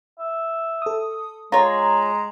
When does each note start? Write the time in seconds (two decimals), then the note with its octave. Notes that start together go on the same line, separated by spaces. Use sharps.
0.19 E5
0.82 A4 D#6
1.52 G#3 F4 C#5 A#5